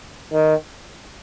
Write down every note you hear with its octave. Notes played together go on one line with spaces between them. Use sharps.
D#3